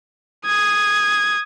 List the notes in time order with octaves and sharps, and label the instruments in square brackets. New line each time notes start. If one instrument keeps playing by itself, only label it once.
[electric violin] D#6 G#6